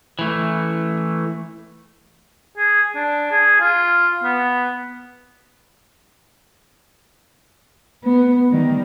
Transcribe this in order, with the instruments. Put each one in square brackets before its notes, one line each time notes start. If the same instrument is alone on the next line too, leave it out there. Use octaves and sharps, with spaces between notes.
[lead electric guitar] E3 A3
[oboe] G#4
D4
G#4
F4
B3
[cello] B3
D#3 G3